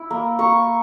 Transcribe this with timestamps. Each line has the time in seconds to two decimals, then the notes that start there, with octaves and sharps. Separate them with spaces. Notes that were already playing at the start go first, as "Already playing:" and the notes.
Already playing: E4
0.11 A#3
0.39 A#3 C#6